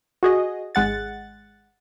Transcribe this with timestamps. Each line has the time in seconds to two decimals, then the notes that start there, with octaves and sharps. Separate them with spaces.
0.23 F#4 G#4 D#5
0.75 G#1 G#3 F#5 A6